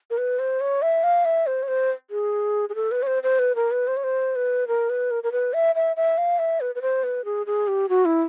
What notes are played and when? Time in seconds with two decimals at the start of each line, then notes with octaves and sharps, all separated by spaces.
0.10 A#4
0.18 B4
0.39 C5
0.61 C#5
0.82 E5
1.04 F5
1.25 E5
1.47 C5
1.63 C#5
1.68 C5
2.11 G#4
2.69 G#4
2.75 A4
2.91 B4
3.03 C#5
3.07 C5
3.23 C5
3.39 B4
3.56 A#4
3.71 B4
3.87 C5
3.97 C#5
4.04 C5
4.36 B4
4.68 A#4
4.90 B4
5.11 A#4
5.23 A#4
5.32 B4
5.54 E5
5.75 E5
5.97 E5
6.18 F5
6.39 E5
6.61 B4
6.75 B4
6.82 C5
7.04 B4
7.25 G#4
7.47 G#4
7.68 G4
7.89 F#4
8.05 E4